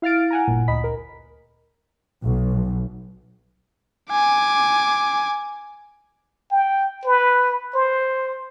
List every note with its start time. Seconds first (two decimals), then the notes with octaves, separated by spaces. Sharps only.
0.02 E4 F5 F6 A6 D7
0.30 F#5 G#5 A#5
0.47 G1 A#2
0.68 D2 D#5 B5 B6
0.84 A#4
2.24 B1
4.11 G#5 D6
6.51 G5
7.05 B4
7.74 C5